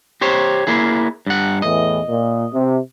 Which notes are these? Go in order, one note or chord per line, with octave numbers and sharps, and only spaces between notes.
G4 C5 C#5
A#3 E4 G#4
G2 F#5
E2 A2 E3 D#5
A#2
C3